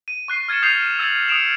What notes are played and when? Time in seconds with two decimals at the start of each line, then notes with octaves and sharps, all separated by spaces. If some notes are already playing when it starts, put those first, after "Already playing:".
0.08 D#7
0.28 C#6 F#6 C7 D#7
0.49 F6 G#6 A6 C#7 E7
0.62 D#6 G6 C7 F7
0.99 E6 G#6 A6
1.28 D#6 C#7 D7 E7 F7